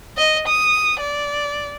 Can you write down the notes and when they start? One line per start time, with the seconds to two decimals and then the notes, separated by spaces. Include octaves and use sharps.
0.17 D#5
0.48 D#6
1.00 D5